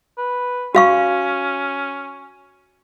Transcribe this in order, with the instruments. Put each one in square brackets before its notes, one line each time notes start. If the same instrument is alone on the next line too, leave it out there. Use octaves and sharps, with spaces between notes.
[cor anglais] B4
[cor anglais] C#4 [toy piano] F#4 F5 C#6